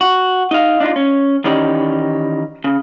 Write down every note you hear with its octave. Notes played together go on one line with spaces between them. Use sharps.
F#4
D#4 D#5 F5
D4 D#4 F4
C#4
D#3 E3 C#4 D#4 G4 D5
C#3